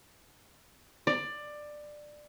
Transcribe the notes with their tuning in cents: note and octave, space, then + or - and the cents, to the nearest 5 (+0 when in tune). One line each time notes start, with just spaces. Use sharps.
D5 +15